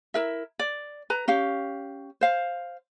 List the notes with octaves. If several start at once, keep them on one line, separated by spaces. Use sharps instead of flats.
E4 A#4 E5
D5
B4 A#5
C#4 G4 F5
C5 F5